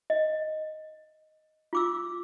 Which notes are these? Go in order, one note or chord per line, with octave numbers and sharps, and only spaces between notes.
D#5
F4 D6 E6